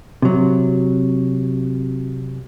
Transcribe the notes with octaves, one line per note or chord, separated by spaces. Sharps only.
C3 F#3